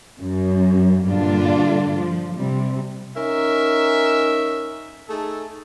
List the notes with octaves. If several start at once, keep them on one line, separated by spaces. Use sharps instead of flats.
F#2
G2 A#2 D3 D4 F4
F3
C3 G3
C#4 D#4 A#4 E5
A3 D#4 G#4 A4